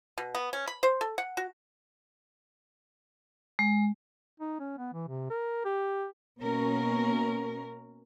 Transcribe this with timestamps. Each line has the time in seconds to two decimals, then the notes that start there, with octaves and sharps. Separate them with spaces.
0.18 B2
0.35 B3
0.53 C#4
0.67 B5
0.83 C5
1.01 A4
1.18 F#5
1.37 F#4
3.59 G#3
4.40 D#4
4.60 C#4
4.78 B3
4.93 E3
5.08 C3
5.30 A#4
5.65 G4
6.41 B2 A#3 C#4 A#4